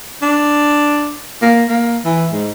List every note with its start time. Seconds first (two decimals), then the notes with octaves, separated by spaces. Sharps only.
0.22 D4
1.42 A#3
1.69 A#3
2.05 E3
2.32 G#2